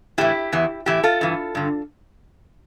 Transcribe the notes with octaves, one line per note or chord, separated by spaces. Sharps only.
A2 E3 E4 G4
E2 E3
A2 E3 E4 G4
F4 A4
G2 E3
G2 D3